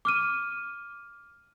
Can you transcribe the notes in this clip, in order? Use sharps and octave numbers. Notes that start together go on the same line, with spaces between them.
D6 F6 D#7